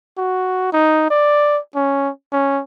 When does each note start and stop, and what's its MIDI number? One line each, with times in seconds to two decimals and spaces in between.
0.18 0.72 66
0.73 1.06 63
1.10 1.59 74
1.75 2.10 61
2.32 2.62 61